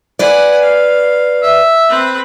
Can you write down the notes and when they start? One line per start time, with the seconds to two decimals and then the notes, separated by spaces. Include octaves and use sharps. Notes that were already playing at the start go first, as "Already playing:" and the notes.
0.19 B4 D5 F#5 G#5
0.62 F5
1.43 E5
1.89 C4 B4